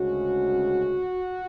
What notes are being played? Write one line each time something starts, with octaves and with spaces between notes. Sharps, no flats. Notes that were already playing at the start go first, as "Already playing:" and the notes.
Already playing: D2 C#3 G#3 C#4 F#4